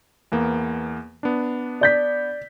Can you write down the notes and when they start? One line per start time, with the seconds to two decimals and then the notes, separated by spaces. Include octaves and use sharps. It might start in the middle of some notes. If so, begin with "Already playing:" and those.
0.32 E2 A#3 B3
1.23 B3 D4
1.81 D5 G6 B6